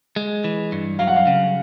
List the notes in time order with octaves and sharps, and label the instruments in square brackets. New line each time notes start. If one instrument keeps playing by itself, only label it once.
[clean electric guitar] G#3
E3
G2
[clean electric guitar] F#3 [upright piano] F5
[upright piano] F#5
F5
[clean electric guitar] C#3